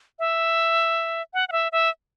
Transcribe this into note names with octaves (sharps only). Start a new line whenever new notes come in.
E5
F#5
F#5
E5
E5